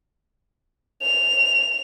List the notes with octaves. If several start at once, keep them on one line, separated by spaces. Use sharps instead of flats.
F7